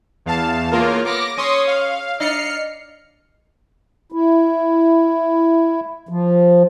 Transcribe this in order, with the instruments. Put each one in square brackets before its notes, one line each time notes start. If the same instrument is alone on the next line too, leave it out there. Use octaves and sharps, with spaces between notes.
[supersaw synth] E2 F5 A5
[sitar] A2 C#3 [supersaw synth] A#3 F4 A#4
[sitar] B3 [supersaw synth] D6 A#6
[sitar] C#4 [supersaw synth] C6 C#6 D#6
[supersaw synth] F5
[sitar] D4 D5 D#5 [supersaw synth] F6 C7 C#7
[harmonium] E4
F3